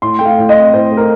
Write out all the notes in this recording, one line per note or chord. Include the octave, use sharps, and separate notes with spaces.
A2 C6
A3 G5
F5
A2
D#5
C4
A2 C5
A3
A#4